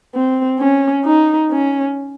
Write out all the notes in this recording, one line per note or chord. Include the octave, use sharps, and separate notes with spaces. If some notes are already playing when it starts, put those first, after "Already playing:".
C4
C#4
D#4
C#4